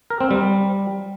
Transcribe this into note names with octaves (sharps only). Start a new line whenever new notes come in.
A#4
C4
G3